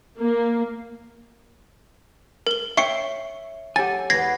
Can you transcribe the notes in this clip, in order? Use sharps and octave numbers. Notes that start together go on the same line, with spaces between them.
A#3
A#4 G7
C#5 E5 G5 C#6 C7 C#7
F#3 G4 A4 G#5 A6
E2 B3 G#6 A#6 C7